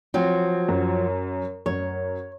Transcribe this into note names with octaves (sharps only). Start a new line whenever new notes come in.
F3 F#3 C4
F#2
F#2 C#5